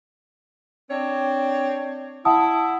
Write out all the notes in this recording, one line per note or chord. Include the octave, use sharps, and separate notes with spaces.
C4 D4 C#5
E4 F#5 A5 D#6